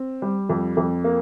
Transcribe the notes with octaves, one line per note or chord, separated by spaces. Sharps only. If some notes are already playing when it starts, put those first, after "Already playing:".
Already playing: C4
G3
F2
F2
A#3